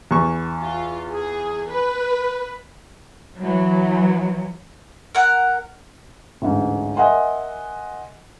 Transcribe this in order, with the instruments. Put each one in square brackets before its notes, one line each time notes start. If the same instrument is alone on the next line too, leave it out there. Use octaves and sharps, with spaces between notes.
[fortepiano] E2 C#6
[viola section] F4
G#4
B4
[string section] E3 F#3
[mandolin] A#4 F#5
[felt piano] A1 D2 G#2
A#4 D#5 E5 F#5 G#5 C6